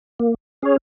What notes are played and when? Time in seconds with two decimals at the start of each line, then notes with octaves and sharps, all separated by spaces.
0.20 A#3
0.62 C#4 G#4 C#5